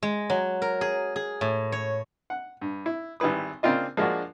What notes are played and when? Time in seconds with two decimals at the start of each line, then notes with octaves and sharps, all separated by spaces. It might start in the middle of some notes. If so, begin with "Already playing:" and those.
0.03 G#3
0.30 F#3
0.62 A#4
0.81 G#4
1.16 G#4
1.41 A2
1.72 C#5
2.30 F#5
2.61 G2
2.86 E4
3.20 G#1 G3 E4 B4 D#6
3.63 C#3 A#3 C4 D4 F4 D#5
3.97 F3 G#3 A#3 D4 F#4